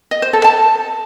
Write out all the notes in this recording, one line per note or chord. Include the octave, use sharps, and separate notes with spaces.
D#5
C5
A4
A5